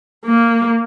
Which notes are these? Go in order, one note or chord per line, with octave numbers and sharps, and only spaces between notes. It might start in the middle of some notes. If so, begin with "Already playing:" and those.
A#3